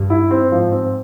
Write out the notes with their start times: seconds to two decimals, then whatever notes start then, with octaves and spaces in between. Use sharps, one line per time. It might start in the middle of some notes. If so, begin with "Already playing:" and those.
Already playing: G2
0.10 E4
0.31 C4
0.52 G#2 F3
0.72 C4